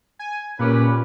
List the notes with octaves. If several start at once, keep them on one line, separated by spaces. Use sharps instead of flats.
G#5
A#2 C#4 G4 B4